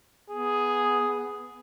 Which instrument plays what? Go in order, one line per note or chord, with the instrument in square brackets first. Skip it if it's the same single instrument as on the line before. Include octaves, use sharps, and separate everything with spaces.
[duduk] B3 [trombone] G#4